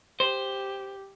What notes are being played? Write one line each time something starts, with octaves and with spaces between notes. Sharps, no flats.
G4 C5